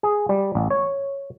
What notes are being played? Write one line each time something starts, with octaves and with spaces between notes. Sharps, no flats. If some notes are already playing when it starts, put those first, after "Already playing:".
G#4
G3
A1
C#5